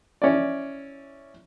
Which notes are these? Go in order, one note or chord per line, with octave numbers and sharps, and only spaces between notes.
C#4 E4 D5